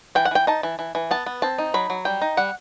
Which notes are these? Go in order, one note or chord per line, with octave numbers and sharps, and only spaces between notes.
E3 G5
F#5
E3 G5
D#4 A5
E3
E3
E3
B3 A5
B3
C4 A5
D#4
F#3 B5
F#3
G3 G5
D#4
G3 F#5